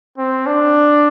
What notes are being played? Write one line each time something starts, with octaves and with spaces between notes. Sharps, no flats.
C4
D4